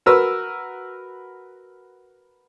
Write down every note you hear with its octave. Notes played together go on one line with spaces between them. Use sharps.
F#4 A#4 B4 E6